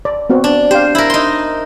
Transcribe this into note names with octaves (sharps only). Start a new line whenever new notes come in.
D5
B3 C4 F#4
D4
G4 C5 F5
E4 A#4 E5
D#4 C6